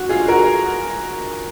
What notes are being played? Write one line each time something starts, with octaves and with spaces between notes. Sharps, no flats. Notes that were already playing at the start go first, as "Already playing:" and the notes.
Already playing: F#4
F4 G#4
F#4 A#4